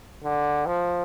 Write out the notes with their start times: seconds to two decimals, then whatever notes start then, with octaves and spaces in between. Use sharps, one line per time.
0.24 D3
0.66 F3